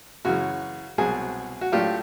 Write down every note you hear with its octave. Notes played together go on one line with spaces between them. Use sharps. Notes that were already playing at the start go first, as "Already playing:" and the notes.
F#2 C#3 E3 F#4
C2 B2 F#3 F#4 G#4
F#4
A2 F#3 A3 D4 F4 G4